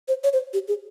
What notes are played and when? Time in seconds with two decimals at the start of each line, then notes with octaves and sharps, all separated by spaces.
0.08 C5
0.24 C#5
0.33 C5
0.53 G4
0.68 G#4